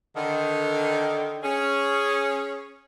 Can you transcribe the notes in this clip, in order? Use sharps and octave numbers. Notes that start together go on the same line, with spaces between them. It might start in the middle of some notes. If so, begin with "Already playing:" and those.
D3 D#3
C#4 G#4